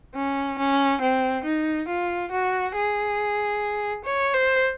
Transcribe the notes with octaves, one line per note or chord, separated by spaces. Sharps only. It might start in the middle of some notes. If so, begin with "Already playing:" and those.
C#4
C#4
C4
D#4
F4
F#4
G#4
C#5
C5